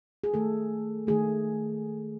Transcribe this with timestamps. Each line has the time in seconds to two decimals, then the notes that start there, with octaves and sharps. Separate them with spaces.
0.24 G#4
0.34 D#3 A3 A4
1.07 D#3 A3 G#4